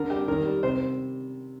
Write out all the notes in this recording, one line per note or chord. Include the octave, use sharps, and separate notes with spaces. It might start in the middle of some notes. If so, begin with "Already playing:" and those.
Already playing: D3 A#4
G3 G4
D#3 A#4
G3
C3 C5